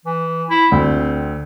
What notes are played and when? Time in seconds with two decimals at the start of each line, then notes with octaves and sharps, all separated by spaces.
0.06 E3
0.50 E4
0.72 D2 C4